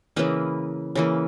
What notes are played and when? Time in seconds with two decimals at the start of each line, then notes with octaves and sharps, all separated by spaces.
0.16 C#3 E3 A#3 B4 D#5
0.95 C#3 E3 A#3